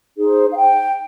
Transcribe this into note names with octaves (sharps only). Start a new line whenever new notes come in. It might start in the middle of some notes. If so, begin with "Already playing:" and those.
D#4 G#4 C5
F5
G5